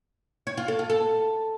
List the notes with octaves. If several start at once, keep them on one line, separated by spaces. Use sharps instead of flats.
C#5
F4
A4
F4
A4